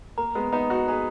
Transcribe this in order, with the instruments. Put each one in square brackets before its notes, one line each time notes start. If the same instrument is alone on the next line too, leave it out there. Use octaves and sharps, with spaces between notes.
[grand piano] A#3 [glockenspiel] A#5
[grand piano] G#3 B3
[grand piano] B3 D#4 [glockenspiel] A#5
[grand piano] D#4 F#4
[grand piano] G#4 B4 [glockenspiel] A#5